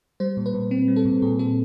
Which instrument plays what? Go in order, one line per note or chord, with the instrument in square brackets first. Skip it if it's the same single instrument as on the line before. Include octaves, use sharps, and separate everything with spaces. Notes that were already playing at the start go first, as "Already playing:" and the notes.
[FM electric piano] G3 C5
A#2
B4
A#2
C4
G3
A4
A#2
A#2 G#4
C4 A4